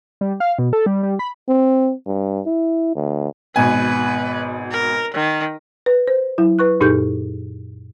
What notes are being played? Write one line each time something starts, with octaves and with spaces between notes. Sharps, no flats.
G3
F5
B2
A4
G3
G3
B5
C4
G2
E4
D2
G#1 B2 B4 G#5
A#4
D#3
B4
C5
F#3 E4
B4 C#6 F#6
F#2 A#2 D#4 G4 A4 G6